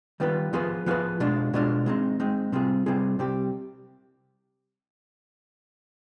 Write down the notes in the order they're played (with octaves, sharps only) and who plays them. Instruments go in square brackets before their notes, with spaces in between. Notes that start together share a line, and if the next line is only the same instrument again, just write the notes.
[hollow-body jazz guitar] D#3 G3 B3 F4 B4
F3 B3 F4 G#4 B4
F3 B3 F4 G#4 B4
B2 G#3 D4 F4
B2 G#3 D4 F4
G#3 C4 D#4
G#3 C4 D#4
C3 G3 C4 F4 G#4
C3 G3 C4 F4 G#4
C3 G3 C4 G4